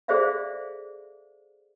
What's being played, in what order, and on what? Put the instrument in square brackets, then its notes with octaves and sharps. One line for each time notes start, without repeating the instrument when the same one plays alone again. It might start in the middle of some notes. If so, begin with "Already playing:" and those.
[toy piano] G#4 A4 C5 D5 E5 F5